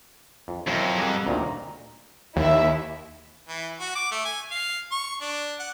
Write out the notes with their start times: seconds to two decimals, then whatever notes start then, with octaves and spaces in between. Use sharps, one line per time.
0.48 F2
0.67 F2 F#3 C4 E4 A#4
0.98 G3 G#4 A#4 F#5 D6 E6
1.27 D2 A#2 D#3 A#5
2.36 D#2 E4 E5
3.48 E3
3.80 F#4
3.95 D6
4.11 A3
4.25 G#5
4.51 F5
4.91 C#6
5.21 D4
5.60 F#5